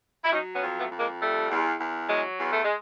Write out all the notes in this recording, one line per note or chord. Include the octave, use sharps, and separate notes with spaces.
E4
F#3 C#4 D#4
B3 C#4
F2
A3 B3
F2
G#3 A#3
G3 A3
E2
E2
F#3 G#3
E2
A3
G#3